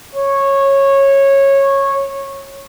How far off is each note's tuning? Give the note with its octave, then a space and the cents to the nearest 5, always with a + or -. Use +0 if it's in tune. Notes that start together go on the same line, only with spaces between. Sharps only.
C#5 -15